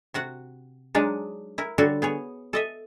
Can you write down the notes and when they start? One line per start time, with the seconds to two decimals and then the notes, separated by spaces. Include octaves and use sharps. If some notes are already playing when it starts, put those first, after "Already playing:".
0.14 C3 F#4 F#5
0.95 F#3 G#3 D4 D#4
1.58 E4 A#4
1.78 D3 G3 F#4 A4 C#5
2.02 B3 G#4 C#5
2.53 A4 D#5 E5